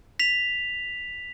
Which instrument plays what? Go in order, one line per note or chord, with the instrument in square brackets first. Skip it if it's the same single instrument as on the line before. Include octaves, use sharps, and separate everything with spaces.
[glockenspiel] B6 F7